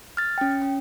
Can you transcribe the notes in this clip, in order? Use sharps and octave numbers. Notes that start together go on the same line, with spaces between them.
F6 A6
C#4 G5
C#4